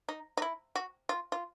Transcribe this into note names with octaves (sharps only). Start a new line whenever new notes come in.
D#4
D#4
E4
F#4
F4
F4